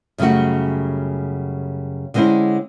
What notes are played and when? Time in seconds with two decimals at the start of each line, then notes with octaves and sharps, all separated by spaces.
0.18 F#2 C#3 G3 A3 F#4
2.14 D3 G#3 C4 C#4 E4